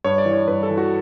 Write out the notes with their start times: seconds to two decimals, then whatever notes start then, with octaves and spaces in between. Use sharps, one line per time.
0.04 G2 C#5
0.18 D5
0.25 E3
0.33 C#5
0.48 G2 B4
0.63 A4
0.71 E3
0.78 F#4